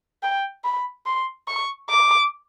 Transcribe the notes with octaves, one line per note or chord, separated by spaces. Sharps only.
G5
B5
C6
C#6
D6